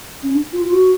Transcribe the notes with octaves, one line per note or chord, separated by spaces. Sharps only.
C#4
D4
F4
F4
F#4